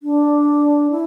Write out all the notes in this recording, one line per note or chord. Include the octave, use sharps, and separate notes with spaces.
D4
E4